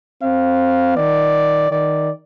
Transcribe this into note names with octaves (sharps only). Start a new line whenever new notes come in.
C4 F5
D#3 D5
D#3 D5